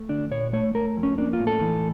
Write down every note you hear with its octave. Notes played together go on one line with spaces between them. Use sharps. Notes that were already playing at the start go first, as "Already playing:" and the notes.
Already playing: A3
D2 D4
A#2 C#5
A3 C#5
A3 A#4
F2
C#4
A#3 D4
F4
A2
A4
E3